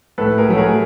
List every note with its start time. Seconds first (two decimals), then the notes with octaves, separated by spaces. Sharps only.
0.18 A2 A4 B4
0.38 G#4 A#4
0.49 F#3 A3
0.58 G#4 A#4